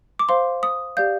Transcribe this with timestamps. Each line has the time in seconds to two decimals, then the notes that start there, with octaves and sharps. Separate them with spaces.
0.19 D6
0.29 C5 F5 C6
0.63 D#6
0.97 G4 D5 F5 G6